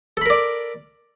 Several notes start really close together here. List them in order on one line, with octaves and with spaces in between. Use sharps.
A4 B5 A#4 D5